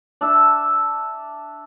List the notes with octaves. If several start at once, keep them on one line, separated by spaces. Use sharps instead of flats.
D4 E5 E6